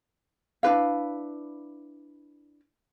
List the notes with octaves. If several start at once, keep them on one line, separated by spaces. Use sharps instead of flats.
D4 E4 B4 F5